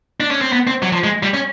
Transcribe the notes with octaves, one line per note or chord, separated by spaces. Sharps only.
D4
C#4
C4
B3
C4
F#3
F3
G#3
G3
C#4